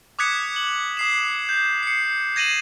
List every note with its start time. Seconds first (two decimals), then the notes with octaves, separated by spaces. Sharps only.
0.19 D6 D#6 F#6 G#6 B6 C#7
0.56 F#7
0.97 D#6 C7 E7
1.49 G6
1.83 C7 C#7
2.36 G#6 A#6 D#7 E7 F#7